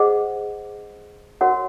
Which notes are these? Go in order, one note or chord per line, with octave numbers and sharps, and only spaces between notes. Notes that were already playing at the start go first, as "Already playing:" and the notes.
Already playing: G#4 C5 D#5 F#5
F#4 A#4 C#5 F#5